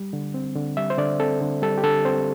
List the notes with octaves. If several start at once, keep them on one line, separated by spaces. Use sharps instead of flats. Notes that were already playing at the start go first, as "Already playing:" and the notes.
Already playing: G3
D3
C4
D3
G3 E5
C5
D3 D5
C4 A4
D3
G3 A4
G4
D3 A4
C4 C5